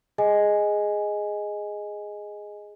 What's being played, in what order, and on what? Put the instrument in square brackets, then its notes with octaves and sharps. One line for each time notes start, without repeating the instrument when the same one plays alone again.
[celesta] G#4 D#5 G#5